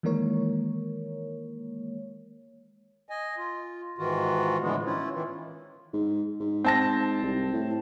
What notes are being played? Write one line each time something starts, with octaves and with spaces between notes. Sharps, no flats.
D#3 E3 G#3 A#3 A#4 C#5
D#5 G#5
F4
G#2 D#3 E3 F4 F#4
A2 D3 E3 F3 G#3 B3
C#4 E4 F4
D#3 E3
G#2
G#2
C4 A5 A#6
C2
A2